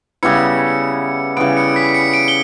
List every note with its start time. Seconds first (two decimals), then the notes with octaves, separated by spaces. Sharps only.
0.23 C#3 G3 B3 E4 C#7
1.37 C#3 E3 G3 B3 D7
1.57 C#7
1.76 B6
1.95 C#7
2.14 D7
2.28 G7